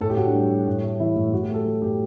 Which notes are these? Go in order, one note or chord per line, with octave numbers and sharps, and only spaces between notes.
A2 A4
G4
A2 F#4
D4
G3
G3
A2
A3
E3 E4
A2
A2 F#4
G4
A3
A4
F#3 A4
A2 G4